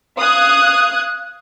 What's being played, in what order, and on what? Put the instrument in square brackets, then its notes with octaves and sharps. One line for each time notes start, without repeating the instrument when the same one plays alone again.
[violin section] F5 D#6 F#6 G#6